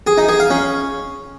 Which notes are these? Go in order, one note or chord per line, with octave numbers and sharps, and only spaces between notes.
G#4
D#4
G#4
F5
C#4